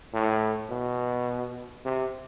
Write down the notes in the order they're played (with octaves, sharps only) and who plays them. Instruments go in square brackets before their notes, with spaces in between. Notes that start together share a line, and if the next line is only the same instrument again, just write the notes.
[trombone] A2
B2
C3